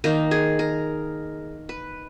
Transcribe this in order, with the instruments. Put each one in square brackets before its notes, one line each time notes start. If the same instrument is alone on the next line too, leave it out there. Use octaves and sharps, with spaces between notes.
[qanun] D#3 A#3 D#4 A#4
G#4
A#4
B4